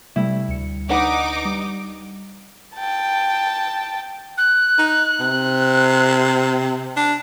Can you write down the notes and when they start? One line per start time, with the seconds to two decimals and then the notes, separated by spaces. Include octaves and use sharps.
0.16 C3 G3 A3 E4
0.48 D2 C#7
0.89 D4 D#4 B4 F#5 D6
1.45 G3
2.76 G5 A5
4.38 F#6
4.78 D#4
5.20 C3
6.96 D4